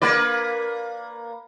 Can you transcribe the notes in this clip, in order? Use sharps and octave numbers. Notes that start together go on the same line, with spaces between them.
A#3 B4 D5